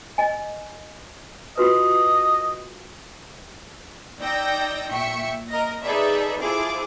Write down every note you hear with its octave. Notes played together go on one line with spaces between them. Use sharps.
D#5 G#5
F4 F#4 B4 D#5
D#4 D5 G5 E6 G6 A#6
A#2 E5 G5 C#6 C#7
A#4 D#5 A#6
D#4 G#4 A4 B4 D5 E5
E4 F4 G#4 A4 C5 D6